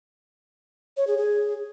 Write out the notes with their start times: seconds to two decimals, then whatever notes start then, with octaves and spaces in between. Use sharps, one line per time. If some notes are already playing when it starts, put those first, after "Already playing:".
0.97 C#5
1.07 G#4
1.17 G#4